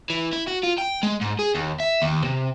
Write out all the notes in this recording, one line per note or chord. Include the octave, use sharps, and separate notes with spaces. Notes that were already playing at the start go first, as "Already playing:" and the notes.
E3
E4
F#4
F4
G5
G#3
G#2
G#4
D#2
E5
D#2
C3